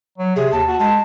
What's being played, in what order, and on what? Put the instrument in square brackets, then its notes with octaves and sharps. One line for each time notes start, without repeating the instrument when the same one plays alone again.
[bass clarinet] F#3
[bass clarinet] C3 [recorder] G#4
[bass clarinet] D#2 [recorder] A5
[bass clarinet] F#4 [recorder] A5
[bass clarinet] G#3 [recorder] A5